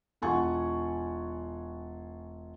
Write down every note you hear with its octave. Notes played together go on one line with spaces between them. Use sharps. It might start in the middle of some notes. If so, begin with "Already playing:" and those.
E1 F4 F#5 G#5 C#6